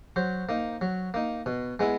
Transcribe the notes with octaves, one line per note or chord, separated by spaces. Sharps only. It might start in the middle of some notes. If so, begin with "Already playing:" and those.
F#3 C5
A#3 D#4
F#3
A#3 D#4
B2
G#3 B3 E4